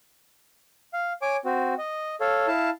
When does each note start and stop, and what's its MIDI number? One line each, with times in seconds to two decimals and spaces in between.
0.93 1.13 77
1.22 1.37 73
1.22 1.37 80
1.22 1.37 86
1.45 1.74 60
1.45 1.74 66
1.78 2.15 75
2.21 2.47 69
2.21 2.47 73
2.21 2.47 77
2.48 2.70 64
2.48 2.70 77
2.48 2.70 81